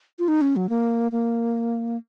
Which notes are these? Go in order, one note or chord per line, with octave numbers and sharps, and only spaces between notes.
F4
D#4
C#4
F#3
A#3
A#3